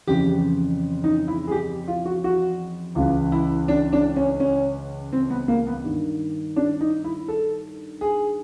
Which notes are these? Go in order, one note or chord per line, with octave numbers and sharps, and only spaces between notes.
F2 C#3 E3 G4
D#4
E4
G#4
G4
F4
F#4
F#4
C#2 C#3 E3 F4
E4
D4
D4
C#4
C#4
C4
B3
A#3
B3
G2 D#3
D4
D#4
E4
A4
G#4